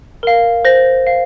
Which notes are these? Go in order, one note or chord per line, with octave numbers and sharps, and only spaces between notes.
A#4 F5
C5 A#6
F5